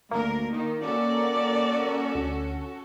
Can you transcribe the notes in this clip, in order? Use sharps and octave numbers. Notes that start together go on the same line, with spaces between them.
D2 A#3 A#4
D#3 D#4
C#4 F#4 A4 D5
D2